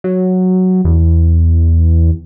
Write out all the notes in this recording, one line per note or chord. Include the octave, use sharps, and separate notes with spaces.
F#3
E2